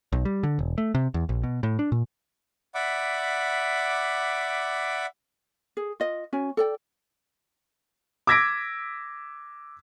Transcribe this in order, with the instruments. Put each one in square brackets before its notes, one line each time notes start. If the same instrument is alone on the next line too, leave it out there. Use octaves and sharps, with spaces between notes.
[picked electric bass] B1
G3
D3
E1
A3
C3
E2
A#1
B2
A2
D4
A#2
[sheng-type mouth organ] D5 E5 F#5 B5 D6
[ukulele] G#4
F4 D#5
C#4 F#4 G#5
A4 D5 G5
[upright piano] D6 E6 G#6 A#6 B6 D7